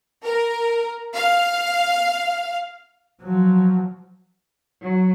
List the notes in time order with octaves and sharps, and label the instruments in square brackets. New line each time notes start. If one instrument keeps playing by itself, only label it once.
[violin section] A#4
F5
[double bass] F3 F#3
[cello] F#3